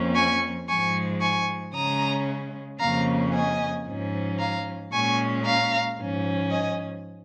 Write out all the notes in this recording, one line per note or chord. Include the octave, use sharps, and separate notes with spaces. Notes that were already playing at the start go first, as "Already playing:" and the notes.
Already playing: F2 F3 A#3 C#4
G#5 C#6
G#2 F3 G#3 G#5 C#6
G#5 C#6
C#3 G#3 C#4 A#5 D#6
F2 C#3 A#3 C#4 F5 A#5
D#5 G#5
G#2 F3 C#4
F5 A#5
A#2 G#3 C#4 G#5 C#6
F5 A#5
G#2 F3 C#4
D#5 G#5